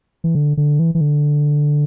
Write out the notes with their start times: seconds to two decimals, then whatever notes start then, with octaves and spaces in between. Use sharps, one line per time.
0.24 E3
0.35 D3
0.57 D3
0.79 E3
0.95 E3
1.01 D3